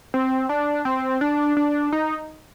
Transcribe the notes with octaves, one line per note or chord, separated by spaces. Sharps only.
C4
D4
C4
D4
D4
D#4